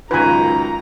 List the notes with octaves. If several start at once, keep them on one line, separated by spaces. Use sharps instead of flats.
C#2 F#2 D#3 F4 B4 G#5 A#5